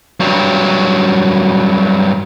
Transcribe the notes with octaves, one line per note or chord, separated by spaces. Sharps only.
G2 F#3